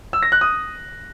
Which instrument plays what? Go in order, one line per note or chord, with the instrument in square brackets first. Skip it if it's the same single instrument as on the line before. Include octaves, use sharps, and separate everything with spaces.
[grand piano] E6
A#6
F#6
D#6